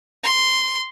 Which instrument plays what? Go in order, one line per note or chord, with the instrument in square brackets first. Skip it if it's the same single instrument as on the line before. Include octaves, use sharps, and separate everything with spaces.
[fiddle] C6